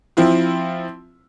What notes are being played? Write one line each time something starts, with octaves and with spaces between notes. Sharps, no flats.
F3 C4 E4 F4